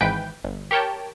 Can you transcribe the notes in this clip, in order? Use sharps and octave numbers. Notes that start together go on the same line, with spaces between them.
G#1 G#2 E3 B4 G5 G6
G1
G4 A#4 C#5 G5 A5